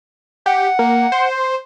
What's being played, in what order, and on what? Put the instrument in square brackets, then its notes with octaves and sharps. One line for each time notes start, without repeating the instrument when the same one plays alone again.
[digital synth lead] G4 [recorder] F#5
[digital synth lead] A#3
C5